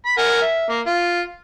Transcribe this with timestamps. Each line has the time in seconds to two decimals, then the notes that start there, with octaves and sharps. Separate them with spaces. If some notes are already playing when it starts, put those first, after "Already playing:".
0.06 B5
0.18 A#4 F#5 G#5
0.41 E5
0.70 A#3
0.86 F4